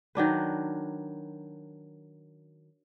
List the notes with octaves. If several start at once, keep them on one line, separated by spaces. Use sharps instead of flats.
D#3 F#3 D4 B4